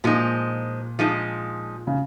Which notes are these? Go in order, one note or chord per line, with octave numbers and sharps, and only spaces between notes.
A#2 F3 G#3 D#4
F3 G#3 D#4
C#3